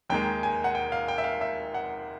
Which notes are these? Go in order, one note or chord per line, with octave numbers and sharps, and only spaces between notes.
D#2 D#3 G#3 G5
G#5
F#5
G5
F5
G5
E5
F5
E5
F#5